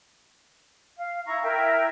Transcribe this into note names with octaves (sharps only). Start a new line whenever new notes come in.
F5
E4 A#5 C#6
E4 A#4 E5 G5